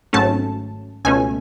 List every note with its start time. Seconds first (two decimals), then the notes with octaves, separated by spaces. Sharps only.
0.13 G#1 G#2 F#3 A3 C#4 A5
1.05 C#2 B2 A3 C#4 G#5